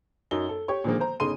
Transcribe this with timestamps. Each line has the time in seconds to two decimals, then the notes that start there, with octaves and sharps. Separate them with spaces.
0.31 F#2 D#4 G7
0.49 A4
0.68 G4 C#5 C#6
0.84 A#2 D3 D#3 F3 G#3 A#3
1.00 C5 A#5
1.20 G1 C#3 D#4 C6 D#7